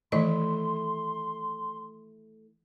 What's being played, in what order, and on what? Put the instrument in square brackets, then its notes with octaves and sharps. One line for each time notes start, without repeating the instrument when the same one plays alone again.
[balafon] D#3 E3 D#5 [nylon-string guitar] A3 E4 [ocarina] C6